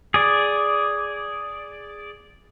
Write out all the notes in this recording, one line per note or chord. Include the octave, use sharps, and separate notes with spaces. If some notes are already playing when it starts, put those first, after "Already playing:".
G#4 D5